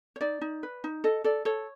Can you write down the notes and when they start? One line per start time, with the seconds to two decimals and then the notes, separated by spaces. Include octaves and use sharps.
0.16 C#5
0.21 D#4 D5
0.41 D#4
0.63 B4
0.84 D#4
1.04 A4 D#5
1.24 A4 D5
1.45 A4 C#5